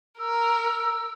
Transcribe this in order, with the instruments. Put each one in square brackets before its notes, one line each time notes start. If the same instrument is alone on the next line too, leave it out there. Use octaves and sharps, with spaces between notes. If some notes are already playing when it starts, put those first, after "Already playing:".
[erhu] A#4 [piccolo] E6